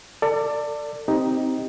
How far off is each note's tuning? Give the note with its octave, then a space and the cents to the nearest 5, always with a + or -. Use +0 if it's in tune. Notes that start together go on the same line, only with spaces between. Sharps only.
A4 +35 D5 +5
C4 +0 D#4 +10 G4 +0